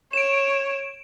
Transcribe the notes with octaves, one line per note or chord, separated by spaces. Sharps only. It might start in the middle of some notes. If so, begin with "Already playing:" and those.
C#5 D7 E7